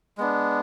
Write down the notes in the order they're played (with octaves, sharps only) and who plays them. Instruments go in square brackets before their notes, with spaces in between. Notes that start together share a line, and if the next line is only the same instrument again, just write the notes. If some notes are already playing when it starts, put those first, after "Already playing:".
[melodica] G#3 B3 D4